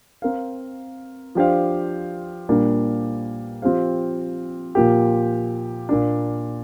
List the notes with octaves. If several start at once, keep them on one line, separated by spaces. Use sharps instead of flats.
C4 A#4 F5
F3 D4 G4 C5 F5
A#2 G3 A#3 D4 G4
F3 C4 G4 C5 F5
A#2 F3 A#3 G4
A#2 A#3 D4